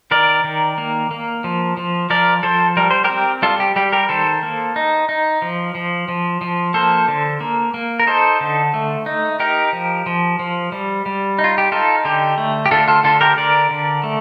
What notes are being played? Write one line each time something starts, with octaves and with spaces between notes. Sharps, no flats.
D#3 A#4 D5
D#3
A#3
A#3
F3
F3
F3 A#4 D5
F3 A4 C5
G3 A#4
C5
G4 A#4
C4
G3 F4 A4
G4
G3 G4
G4 A#4
D#3 A4 C5
A#3
D#4
D#4
F3
F3
F3
F3
A#3 A4 C5
D3
A#3
A#3
A#4
D#4 A4 C5
D3
A3
D#4
D#4 G4 A#4
F3
F3
F3
G3
G3
D#4
F4
G4
D#4 F4 A4
D3 G4
A3
G4
D3 F4 A4
F4 A4
D3 F4 A4
G4 A#4
D3 A#4 D5
D3
A3